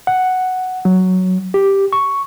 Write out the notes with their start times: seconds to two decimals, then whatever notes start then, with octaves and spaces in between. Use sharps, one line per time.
0.07 F#5
0.85 F#3
1.54 G4
1.93 C#6